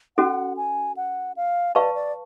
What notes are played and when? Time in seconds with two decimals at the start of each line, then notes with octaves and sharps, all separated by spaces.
0.17 C#4 F#4 A4 F#5
0.57 G#5
0.97 F#5
1.36 F5
1.75 B4 D5 F5 A5 C#6
1.95 D5